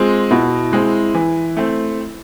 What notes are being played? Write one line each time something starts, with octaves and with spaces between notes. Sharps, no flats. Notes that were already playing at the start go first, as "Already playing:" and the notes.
Already playing: G#3 C4 F4
B2 E4
G#3 C4
E3
A3 C4